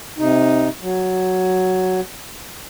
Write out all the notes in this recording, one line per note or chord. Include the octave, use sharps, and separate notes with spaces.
C3 D#4
F#3